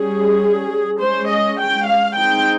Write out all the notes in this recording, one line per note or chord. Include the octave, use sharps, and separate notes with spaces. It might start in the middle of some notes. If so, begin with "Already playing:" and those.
Already playing: G3 C#4 G#4
G#3 C#4 C5
D#5
G5
F5
G#3 C4 D#4 G5